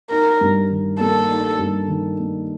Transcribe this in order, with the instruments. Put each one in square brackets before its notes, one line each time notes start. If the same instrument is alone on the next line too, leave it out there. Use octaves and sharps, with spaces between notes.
[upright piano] D#4 [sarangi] A#4
[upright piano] G2
D#3
[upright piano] A#3 [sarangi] A4
[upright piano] D#4
G2
D#3
A#3